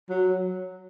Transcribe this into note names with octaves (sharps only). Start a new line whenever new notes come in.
F#3